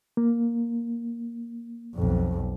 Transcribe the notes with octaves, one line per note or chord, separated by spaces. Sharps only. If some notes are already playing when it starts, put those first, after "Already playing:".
A#3
B1 F2